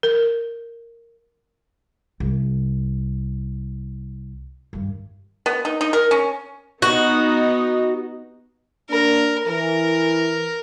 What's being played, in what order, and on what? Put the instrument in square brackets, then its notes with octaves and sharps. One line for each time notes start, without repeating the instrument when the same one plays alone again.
[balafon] A#4
[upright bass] C2
G2 D#3
[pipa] B3
D#4
D#4
A#4
C#4
[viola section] B3 D#4 [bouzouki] F#4
[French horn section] A#3 D4 [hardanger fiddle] A#4
[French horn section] E3 [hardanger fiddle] A#4